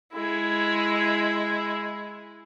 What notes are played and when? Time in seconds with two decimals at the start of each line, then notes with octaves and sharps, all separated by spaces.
0.12 G#3 E4